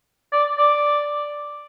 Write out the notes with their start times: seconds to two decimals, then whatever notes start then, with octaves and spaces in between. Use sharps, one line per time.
0.33 D5
0.58 D5